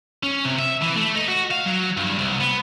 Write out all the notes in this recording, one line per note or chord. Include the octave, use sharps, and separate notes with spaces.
C#4
C3
E5
E3
A3
D#4
F#4
F5
F#3
G2
C2
B3